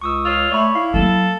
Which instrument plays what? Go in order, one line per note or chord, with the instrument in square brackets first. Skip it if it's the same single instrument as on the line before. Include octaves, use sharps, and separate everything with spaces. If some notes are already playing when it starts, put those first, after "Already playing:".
[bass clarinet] C#2 [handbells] C#6 D#6 E6
[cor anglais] F4 [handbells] C#5 E6
[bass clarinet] A3 [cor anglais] C#5 [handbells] D5 B5
[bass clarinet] E4 [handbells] F5
[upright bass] F#3 A#3 [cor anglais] A4